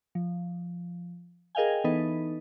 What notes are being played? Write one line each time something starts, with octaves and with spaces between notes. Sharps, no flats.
F3
G#4 A#4 D#5 F5 G5 G#5
E3 B3 D#4 A4 B4 D#5